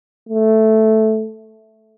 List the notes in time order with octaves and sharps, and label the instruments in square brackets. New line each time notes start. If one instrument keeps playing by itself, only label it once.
[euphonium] A3